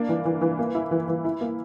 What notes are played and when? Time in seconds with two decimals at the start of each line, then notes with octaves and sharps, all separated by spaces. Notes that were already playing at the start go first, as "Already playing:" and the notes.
Already playing: A#3 D4
0.09 E3
0.25 E3
0.41 E3
0.59 A#3
0.75 E4
0.91 E3
1.08 E3
1.25 E4
1.41 A#3